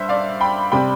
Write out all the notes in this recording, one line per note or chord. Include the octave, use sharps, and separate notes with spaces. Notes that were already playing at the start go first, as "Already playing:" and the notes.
Already playing: G2 C5 E5
D5 F5
G5 B5
C3 G3 C4 G5 B5